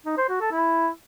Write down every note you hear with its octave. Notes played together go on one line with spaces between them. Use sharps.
D#4
C5
F#4
A4
E4